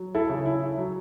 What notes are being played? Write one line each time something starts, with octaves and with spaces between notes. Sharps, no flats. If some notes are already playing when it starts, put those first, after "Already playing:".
Already playing: F#3
E4 A4
C#3
E4
F#3